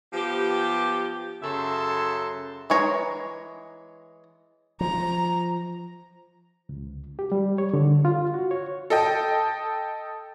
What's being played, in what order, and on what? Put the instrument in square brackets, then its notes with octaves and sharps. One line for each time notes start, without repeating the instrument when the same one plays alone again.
[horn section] F3 B3 G4
F#2 C#3 A4 E5 C6
[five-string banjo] E3 G#3 C#5 A#5
[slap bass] F3 [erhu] A#5
[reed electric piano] C#2
G4
G3
C#5
D3
F4
F#4
C#5
[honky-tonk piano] A4 D#5 G5